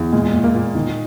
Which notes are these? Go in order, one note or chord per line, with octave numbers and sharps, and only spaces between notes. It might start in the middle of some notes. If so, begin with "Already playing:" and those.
Already playing: E2
A#2 G#3
A#2
A#3
A#2
D#3